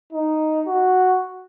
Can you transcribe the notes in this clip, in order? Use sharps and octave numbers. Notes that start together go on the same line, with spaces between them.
D#4
F#4